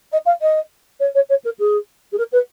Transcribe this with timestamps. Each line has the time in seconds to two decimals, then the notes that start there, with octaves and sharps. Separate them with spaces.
0.12 D#5
0.26 F5
0.41 D#5
1.00 C#5
1.15 C#5
1.29 C#5
1.44 A#4
1.59 G#4
2.12 G#4
2.17 A#4
2.32 B4